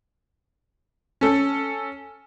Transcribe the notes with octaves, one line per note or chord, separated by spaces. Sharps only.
C#4 A4